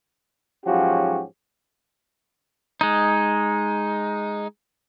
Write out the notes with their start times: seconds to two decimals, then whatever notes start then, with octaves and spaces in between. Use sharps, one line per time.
0.66 G#2 F3 F#3 C#4 F#4 G4
2.81 G#3 D#4